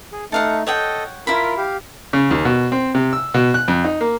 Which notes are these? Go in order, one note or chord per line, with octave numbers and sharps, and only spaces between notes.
G#4
A3 D#4 A4 F5 F#5
A4 C#5 D#5 F#5 G5
E4 F4 A#4 B5
G4 F5
C#3
D#2
B2
C4
C3
E6
B2
F#6
F2
D#4
A#3